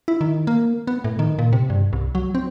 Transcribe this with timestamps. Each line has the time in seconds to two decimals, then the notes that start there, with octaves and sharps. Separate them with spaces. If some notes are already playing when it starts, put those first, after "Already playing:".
0.08 E4
0.21 D#3
0.47 A#3
0.87 B3
1.04 A2
1.19 D#3
1.39 A#2
1.53 C3
1.70 G2
1.93 C2
2.15 F#3
2.35 C4